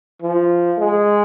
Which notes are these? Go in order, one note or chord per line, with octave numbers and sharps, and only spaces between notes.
F3
G#3